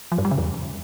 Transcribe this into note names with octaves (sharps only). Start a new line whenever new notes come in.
F3
G2
G3
C#3
E2